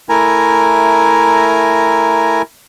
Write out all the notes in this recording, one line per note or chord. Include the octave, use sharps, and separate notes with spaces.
A3 E4 A#4 G#5 A#5